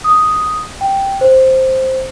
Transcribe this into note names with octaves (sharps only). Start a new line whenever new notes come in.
D#6
G5
C5